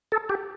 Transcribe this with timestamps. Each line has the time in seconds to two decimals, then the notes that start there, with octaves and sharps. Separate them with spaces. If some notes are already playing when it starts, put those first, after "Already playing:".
0.12 A4
0.29 G4